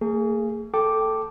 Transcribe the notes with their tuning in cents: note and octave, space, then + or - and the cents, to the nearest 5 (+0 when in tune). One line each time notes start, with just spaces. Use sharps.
A#3 -45 G#4 +0
A4 +0 G5 +0 D6 +0